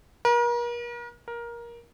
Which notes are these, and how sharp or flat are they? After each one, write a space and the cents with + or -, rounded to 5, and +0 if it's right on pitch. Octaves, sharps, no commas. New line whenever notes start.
A#4 +40
A#4 +15